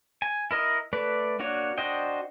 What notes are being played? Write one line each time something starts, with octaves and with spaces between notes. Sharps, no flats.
G#5
E4 A#4 D#5
A3 B4 D5
A#3 D4 F#4 C#5
D4 F#4 C5 D#5 G5